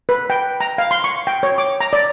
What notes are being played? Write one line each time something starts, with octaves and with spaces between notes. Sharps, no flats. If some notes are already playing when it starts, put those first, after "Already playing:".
B4
G5
A#5
F5
C6
C#6
G5
C#5
D6
A#5
D5